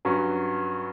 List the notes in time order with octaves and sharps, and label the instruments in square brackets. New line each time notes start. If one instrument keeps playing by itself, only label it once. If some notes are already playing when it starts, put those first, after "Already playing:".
[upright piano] G2 F#3 C#4